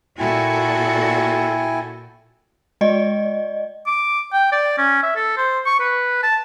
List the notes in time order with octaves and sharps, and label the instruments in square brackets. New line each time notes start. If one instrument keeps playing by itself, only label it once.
[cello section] A#2 F#4 A4 [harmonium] E4 G5 G#5
[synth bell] G#3 D5 D#5
[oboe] D6
G5
D5
C#4
E5
A4
C5
C#6
B4
A5